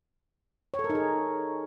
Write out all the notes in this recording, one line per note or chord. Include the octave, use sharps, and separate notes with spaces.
C#5
A4
A#4
D#4
G#4